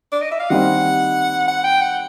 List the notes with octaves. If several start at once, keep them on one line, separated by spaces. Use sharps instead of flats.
D5
D#5
E5
F5
D#3 G3 C4 D#4 F#5
F#5
G5
F#5